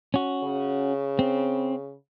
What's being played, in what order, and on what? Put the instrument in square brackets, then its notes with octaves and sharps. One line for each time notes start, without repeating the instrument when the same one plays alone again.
[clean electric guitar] C#4 F#4
[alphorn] C#3
[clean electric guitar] C4